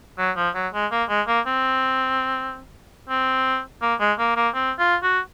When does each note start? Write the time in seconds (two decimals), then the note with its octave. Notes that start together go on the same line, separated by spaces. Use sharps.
0.18 F#3
0.37 F3
0.55 F#3
0.74 G#3
0.91 A#3
1.09 G#3
1.27 A#3
1.46 C4
3.09 C4
3.82 A#3
4.00 G#3
4.19 A#3
4.36 A#3
4.54 C4
4.79 F4
5.03 F#4